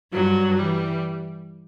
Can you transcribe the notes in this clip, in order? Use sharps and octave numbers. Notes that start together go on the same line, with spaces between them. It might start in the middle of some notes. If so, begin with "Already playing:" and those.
G2 F#3
E3 G3